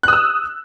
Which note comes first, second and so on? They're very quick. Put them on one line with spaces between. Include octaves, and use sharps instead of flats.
F#6 D#6 E6